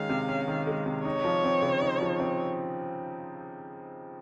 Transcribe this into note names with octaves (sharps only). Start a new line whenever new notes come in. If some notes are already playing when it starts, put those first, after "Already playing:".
Already playing: D#3 G#3 C#4 F5
C3
C#4
D#3
G#3
C3
D#4 C#5
F3
C4
C#3
D#4
F3
C4